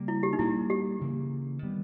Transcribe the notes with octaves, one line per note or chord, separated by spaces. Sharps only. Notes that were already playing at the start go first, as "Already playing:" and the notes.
Already playing: C#3 G3 A#3
E4
G4
D#4
A#2 G3 A#3 E4
G4
C#3 E3 A#3
D#3 G3 B3